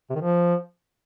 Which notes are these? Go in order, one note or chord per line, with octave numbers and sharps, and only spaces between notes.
C3
D#3
F3